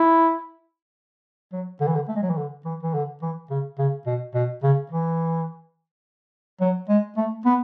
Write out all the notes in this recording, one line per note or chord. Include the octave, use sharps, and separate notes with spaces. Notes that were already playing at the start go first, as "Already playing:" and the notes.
Already playing: E4
F#3
D3
E3
D3
A3
G#3
F#3
E3
D3
E3
E3
D3
E3
C#3
C#3
B2
B2
C#3
E3
F#3
G#3
A3
B3